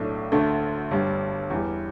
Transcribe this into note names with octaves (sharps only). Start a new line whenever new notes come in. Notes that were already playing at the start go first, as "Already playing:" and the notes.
Already playing: B1 A2 A3 D4
D2 D3 A3
G1 G2 G3
E2 E3 G3